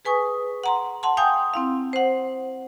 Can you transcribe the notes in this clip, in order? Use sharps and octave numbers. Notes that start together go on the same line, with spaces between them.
G#4 B4 G#5 C#6 D#6
F#5 A#5 C6
F#5 A5 C6
F5 G5 G#5 D#6 G6
C4 E4 F5
C5 F#5